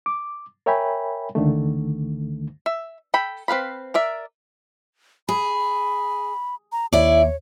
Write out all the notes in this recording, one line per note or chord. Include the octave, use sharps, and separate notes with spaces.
D6
A#4 C#5 E5 G5 G#5 B5
C#2 D3 D#3 A3
E5
A4 G5 B5
C4 B4 F5 B5
A#4 D5 E5
G#4 B5
A#5
D#2 E4 C#5 D5